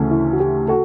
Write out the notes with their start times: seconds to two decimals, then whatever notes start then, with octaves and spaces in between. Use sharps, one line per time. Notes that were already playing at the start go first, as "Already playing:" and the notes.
Already playing: D2 C#3 E3 A3 C#4
0.11 E4
0.33 F#4
0.40 G4
0.68 F#4 A4